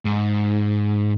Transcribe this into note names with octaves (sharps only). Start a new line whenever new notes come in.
G#2